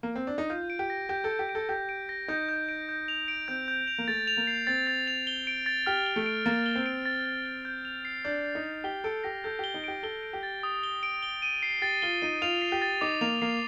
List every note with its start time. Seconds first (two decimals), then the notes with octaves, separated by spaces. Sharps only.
0.03 A#3
0.16 C4
0.27 D4
0.38 D#4
0.50 F4 G6
0.70 D7
0.79 G4
0.90 A#6
1.09 G4 G6
1.24 A4
1.30 G6
1.39 G4
1.49 D7
1.55 A4
1.69 G4 G6
1.89 D7
2.09 A#6
2.28 D#4 G6
2.49 G6
2.69 D7
2.89 G6
3.08 F7
3.28 D7
3.48 C4 G6
3.68 G6
3.87 F7
3.98 A#3
4.08 A3 A6
4.27 F7
4.37 A#3
4.47 C7
4.67 C4 A6
4.87 A6
5.07 F7
5.27 G7
5.47 D7
5.66 A6
5.86 G4 F6
6.06 G7
6.16 A3
6.26 D7
6.46 A#3 A6
6.66 G7
6.75 C4
6.86 D7
7.06 A6
7.26 A6
7.46 G7
7.65 G6
7.85 F7
8.05 C7
8.24 D4 G6
8.44 G6
8.55 D#4
8.64 F7
8.84 G4 G7
9.04 A4 D7
9.24 G4 A#6
9.44 A4 G6
9.59 G4 G7
9.74 D#4
9.84 G4 D7
10.03 A4 G7
10.23 D7
10.33 G4
10.43 A6
10.63 D#6
10.83 G7
11.03 D7
11.23 G7
11.42 D#7
11.63 C7
11.82 G4 A6
12.02 F4 G7
12.22 D#4 D#7
12.42 F4 F7
12.62 C7
12.72 G4
12.82 A6
13.01 D#4 D6
13.21 A#3 F7
13.42 A#3 C7